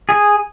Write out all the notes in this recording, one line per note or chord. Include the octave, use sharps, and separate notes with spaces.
G#4